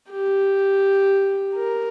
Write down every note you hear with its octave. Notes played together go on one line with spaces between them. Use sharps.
G4
A#4